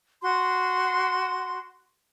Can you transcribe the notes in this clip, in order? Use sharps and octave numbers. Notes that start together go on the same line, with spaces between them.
F#4 C6